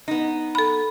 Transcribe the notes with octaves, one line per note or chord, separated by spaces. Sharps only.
B3 D#4
A4 B5